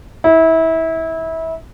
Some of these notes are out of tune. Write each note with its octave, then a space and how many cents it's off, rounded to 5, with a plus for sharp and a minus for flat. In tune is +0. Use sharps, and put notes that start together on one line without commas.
E4 -25